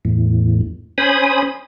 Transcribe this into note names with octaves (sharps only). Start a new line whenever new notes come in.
E2 A2
C#4 C5 G#5 B5 D#6